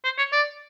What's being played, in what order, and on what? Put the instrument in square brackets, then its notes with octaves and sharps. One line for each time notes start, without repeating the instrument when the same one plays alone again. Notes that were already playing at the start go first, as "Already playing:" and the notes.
[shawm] C5
C#5
D5